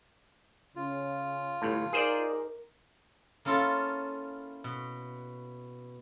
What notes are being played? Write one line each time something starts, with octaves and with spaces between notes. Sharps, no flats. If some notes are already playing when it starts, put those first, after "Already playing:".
C#3 F4
G1 A2
D#4 G#4 A#4 C5 D5
A#3 C#4 E4 F4 A4
B2